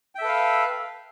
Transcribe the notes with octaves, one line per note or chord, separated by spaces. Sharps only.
A4 B4 E5 F5 G5